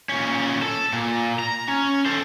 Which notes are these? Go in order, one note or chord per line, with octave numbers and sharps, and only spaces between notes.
A#2 C#4
A4
A#2
A#5
C#4
A4 C5